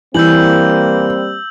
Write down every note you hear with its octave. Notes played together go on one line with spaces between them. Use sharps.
E3 G3 A#3 C4 E6 G6 F#7